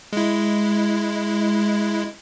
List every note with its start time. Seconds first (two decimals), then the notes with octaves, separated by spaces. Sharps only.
0.13 G#3 E4